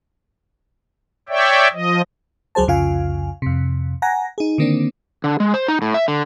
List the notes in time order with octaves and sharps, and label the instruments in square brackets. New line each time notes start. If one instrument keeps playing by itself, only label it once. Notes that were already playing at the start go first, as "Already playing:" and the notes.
[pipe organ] C#5 D5 E5 G5
F3 D#5
[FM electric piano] C#2 F#3 G#4 C5 A5
C2 F2 C#3 F4 F5 G#5
F2 C3
F#5 G#5 A#5 A#6
D#4 G#4
D3 D#3 A#3 C4 D4
[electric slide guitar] D3
G#3
C5
D#4
A2
E5
D3